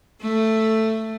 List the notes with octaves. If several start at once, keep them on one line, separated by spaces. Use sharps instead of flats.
A3